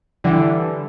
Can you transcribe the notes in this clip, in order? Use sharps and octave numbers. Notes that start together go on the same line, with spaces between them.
D3 E3 G3